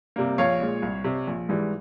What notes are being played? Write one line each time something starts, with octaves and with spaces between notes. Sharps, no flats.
C3 G3 A#3
A#1 C#5 F5
A#2 G#3
C2
C3 G3
A#1
G#2 E3 G3